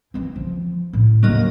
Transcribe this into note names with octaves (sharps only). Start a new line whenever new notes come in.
E3 C4
F3
A2
D#2 D3 F#3 A#3 D#5